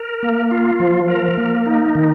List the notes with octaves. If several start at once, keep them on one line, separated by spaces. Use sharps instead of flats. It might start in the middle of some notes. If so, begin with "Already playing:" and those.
Already playing: A#4
A#3
F4
F3
A#4
A#3
D#4
D#3